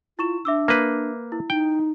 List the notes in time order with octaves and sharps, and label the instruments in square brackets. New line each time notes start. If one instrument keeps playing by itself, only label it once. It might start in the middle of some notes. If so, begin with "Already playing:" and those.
[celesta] E4 C#6 E7 [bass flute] F4
[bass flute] D4 [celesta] E5 D6 E6
[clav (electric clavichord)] A#3 B4
[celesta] E4
[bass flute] D#4 [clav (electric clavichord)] G5